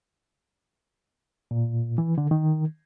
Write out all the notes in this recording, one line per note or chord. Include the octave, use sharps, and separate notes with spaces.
A#2
E3
D3
D#3